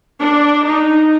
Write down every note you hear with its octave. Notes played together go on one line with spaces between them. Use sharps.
D4
D#4